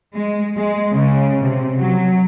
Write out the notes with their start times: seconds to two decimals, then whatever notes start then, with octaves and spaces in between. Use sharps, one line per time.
0.15 G#3
0.57 G#3
0.92 C#3
1.42 C3
1.78 F#3